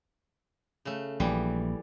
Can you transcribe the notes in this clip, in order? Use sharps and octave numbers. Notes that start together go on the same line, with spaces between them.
C#3 A3
A#1 E3 G3